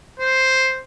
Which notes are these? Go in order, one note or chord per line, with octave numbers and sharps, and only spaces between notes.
C5